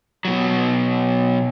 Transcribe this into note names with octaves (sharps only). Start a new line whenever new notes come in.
B2 F#3